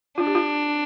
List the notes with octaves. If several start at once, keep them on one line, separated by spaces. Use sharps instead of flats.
D4 F4
G4
F4